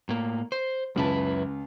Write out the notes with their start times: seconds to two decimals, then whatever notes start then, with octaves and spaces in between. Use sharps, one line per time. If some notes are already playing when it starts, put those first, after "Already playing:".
0.09 A2 A#3
0.52 C5
0.96 C#2 F#2 E4 B4 A5